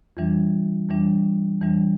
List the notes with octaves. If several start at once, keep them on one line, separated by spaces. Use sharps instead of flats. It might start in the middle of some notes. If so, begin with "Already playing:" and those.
F2 E3 G3 D4
F2 E3 G3 D4
F2 E3 G3 D4